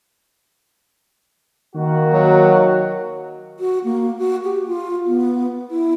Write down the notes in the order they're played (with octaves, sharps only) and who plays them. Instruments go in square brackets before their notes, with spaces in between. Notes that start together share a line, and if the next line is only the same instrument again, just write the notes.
[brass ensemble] D#3 A#3 F#4
[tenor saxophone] F#3
[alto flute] F#4
A#3
F#4
G4
F4
B3
E4